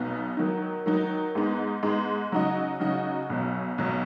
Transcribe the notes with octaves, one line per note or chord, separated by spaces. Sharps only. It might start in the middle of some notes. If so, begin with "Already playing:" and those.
Already playing: B1 B2 B3 D#4
D#3 F#3 D#4
D#3 F#3 D#4
G#2 G#3 B3 D#4
G#2 G#3 B3 D#4
C#3 F#3 D#4 F#4 D#5
C#3 F#3 D#4 F#4 D#5
B1 B2 F#3
B1 B2 F#3